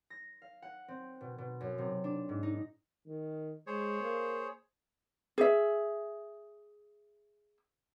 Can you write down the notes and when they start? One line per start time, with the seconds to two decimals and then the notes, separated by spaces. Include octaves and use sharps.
0.10 A#6
0.42 F5
0.62 F#5
0.88 C4
1.21 B2
1.38 B2
1.61 F#2
1.78 C3
2.04 D4
2.29 G#2
2.43 D#4
3.07 D#3
3.67 G#3 G#4 C5 C#5
4.01 A#3
5.38 G#4 E5